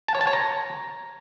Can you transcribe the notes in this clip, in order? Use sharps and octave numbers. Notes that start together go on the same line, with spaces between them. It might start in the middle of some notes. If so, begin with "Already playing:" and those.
A5
C#5
A5
C#5
A#5